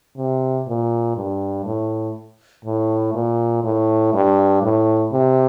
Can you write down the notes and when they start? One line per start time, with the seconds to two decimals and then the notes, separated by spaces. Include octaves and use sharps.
0.17 C3
0.67 A#2
1.16 G2
1.65 A2
2.65 A2
3.14 A#2
3.64 A2
4.13 G2
4.62 A2
5.12 C3